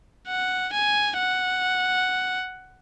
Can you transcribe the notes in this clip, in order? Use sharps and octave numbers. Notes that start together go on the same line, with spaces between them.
F#5
G#5
F#5